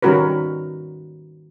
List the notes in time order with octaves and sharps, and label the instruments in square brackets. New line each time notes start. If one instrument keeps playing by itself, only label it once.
[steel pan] D#3 G3 C#4 F#4 A#4 B4